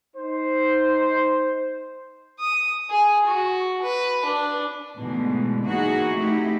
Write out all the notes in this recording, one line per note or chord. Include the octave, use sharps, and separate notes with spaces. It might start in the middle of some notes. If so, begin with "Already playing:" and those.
D#4 C5
D#6
G#4
F#4
B4
D4
G#2 B2 D3 E3 G#3 A3
E3 A#3 D#4 E4 F#4 G#4
A3 C4 D#4 E4 G4